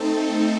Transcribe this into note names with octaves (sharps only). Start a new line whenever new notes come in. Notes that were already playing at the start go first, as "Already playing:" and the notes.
Already playing: A3 C4 D#4 A4